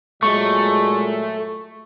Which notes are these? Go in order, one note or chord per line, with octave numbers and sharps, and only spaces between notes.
A#2 F#3 G#3 A3 C#6